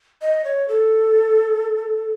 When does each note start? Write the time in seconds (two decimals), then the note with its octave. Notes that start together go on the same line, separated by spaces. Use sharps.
0.22 D#5
0.44 C#5
0.68 A4